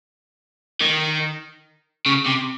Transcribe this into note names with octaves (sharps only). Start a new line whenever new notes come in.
D#3
C#3
C3